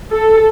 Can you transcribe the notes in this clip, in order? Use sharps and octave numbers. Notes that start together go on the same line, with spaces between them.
A4